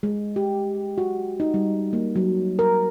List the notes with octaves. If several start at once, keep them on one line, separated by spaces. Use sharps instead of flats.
G#3
G4
F#4
D#4
G3
A#3
F#3
A#4